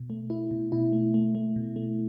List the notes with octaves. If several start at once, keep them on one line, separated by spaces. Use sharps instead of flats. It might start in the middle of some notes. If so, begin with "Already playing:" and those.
Already playing: B2
A3
A3 E4
B2
B2 E4
A3
A3
A3
B2
A3